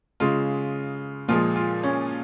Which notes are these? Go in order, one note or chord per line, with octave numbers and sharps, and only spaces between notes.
C#3 G#3 F4
A#2 F3 G#3 F4
F4
C#4